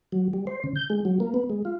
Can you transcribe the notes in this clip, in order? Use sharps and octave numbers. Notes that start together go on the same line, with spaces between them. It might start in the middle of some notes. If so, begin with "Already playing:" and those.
F#3
G3
C5
C#3
G6
G#3
F#3
A#3
B3
G#3
F4